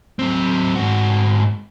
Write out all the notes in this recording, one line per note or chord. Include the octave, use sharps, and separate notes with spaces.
F#3 C4
G#2 F#4